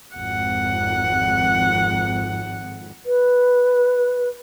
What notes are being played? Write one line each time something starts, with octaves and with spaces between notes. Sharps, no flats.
G#1 F2 F#5
B4